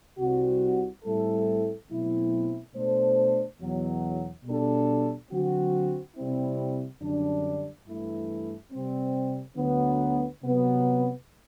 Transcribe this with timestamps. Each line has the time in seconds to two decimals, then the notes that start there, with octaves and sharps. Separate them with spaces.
0.19 C2 C3 G3 C4 F#4
1.05 A2 G3 C4 E4 A4
1.90 B2 F#3 A3 C4 E4
2.75 B2 A3 D4 A4 C5
3.61 E2 B2 F#3
4.45 B2 G3 D4 A4
5.31 D3 F#3 C4 F#4
6.16 C3 G3 C4 E4
7.01 F#2 D3 G3 D4
7.86 G2 E3 A3 E4
8.72 C3 G3 C4
9.57 D2 D3 F#3 B3
10.42 C3 F#3 B3